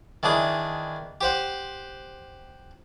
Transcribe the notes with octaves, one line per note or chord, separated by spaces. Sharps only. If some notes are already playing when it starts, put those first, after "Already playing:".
D#3 E3 D4 G#4 D#6
G4 C5 F#5